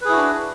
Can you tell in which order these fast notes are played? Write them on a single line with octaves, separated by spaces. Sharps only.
B4 G#4 E4 F#4 D4